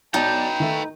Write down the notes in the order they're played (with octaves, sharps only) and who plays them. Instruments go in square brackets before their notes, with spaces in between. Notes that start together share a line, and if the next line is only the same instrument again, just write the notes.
[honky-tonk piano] B1 [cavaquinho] D#4 [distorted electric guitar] B4 G5 [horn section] D5 A5
[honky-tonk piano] D#3 [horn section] A3